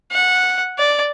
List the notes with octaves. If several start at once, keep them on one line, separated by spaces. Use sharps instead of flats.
F#5
D5